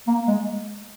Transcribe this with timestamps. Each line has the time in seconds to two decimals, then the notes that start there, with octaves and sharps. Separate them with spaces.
0.07 A#3
0.27 G#3